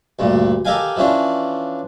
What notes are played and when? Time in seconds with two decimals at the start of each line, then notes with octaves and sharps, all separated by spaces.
0.19 D2 G2 A#2
0.65 G4 A4 A#4 D#5 F5 G#5
0.96 E3 F3 C#4 D4